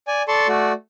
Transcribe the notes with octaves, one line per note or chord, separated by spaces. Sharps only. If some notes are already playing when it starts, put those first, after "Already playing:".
D5 G#5
A4 D5 A5 C6 C#6
A3 F#4 D5